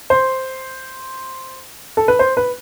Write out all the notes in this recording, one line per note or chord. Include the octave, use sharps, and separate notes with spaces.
C5
A4
B4
C5
B4